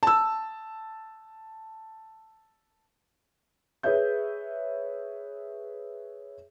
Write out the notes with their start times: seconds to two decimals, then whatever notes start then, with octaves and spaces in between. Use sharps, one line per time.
0.03 A5 E6
3.83 G#4 B4 C#5 E5 G6